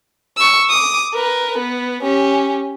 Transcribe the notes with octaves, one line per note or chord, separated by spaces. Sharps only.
C#6 E6
D6 D#6
A#4 B4
B3
C#4 G4